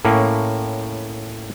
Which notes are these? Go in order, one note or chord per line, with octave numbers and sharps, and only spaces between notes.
A2 A#3 C#4